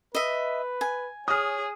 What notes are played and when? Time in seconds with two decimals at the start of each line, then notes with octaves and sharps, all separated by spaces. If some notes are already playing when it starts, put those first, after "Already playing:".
0.15 B4 D#5 E5
0.81 G#5
1.28 G#4 C#5 D#6 F6